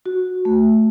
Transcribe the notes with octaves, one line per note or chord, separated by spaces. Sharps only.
F#4
A3